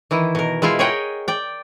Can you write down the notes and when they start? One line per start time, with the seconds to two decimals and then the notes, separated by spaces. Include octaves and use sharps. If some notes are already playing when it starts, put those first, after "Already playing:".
0.11 D#3 E3 E4
0.35 B2 A#4
0.62 G#3 E4 F4 E5 F5
0.79 G#4 A#4 C#5 D#5 F#5 G5
1.28 D5 G5